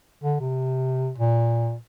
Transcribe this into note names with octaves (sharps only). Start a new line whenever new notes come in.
D3
C3
A#2